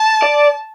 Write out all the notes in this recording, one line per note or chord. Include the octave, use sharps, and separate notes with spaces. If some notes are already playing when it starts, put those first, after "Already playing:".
Already playing: A5
D5